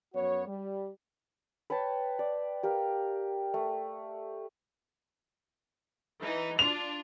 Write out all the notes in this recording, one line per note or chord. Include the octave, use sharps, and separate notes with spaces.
F#2 B3 F#4 C#5
G3
B4 C#5 G5 A5
D5
G4 A#4 F5
A3
E3 D#4
D4 F4 F7